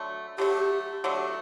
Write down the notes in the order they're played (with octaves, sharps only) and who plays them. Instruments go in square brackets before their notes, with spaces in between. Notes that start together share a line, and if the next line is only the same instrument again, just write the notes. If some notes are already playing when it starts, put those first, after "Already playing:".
Already playing: [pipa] D3 F#3 A3
[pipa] D3 F#3 A3 [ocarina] G4
[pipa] D3 F#3 A3